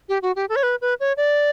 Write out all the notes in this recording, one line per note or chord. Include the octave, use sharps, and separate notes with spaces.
G4
F#4
G4
A4
C#5
B4
B4
C#5
D5